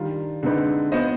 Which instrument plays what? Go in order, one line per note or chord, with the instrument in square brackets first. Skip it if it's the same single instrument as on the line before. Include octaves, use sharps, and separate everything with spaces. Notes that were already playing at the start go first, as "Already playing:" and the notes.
Already playing: [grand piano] D#3 G3 D4 F4
D3 G#3 C4 D#4 B4
B3 F4 C5 D#5